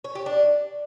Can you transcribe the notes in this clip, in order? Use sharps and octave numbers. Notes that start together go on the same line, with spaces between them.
C#5
G4
D4